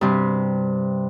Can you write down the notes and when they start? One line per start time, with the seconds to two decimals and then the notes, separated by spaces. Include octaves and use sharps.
0.01 G2 C3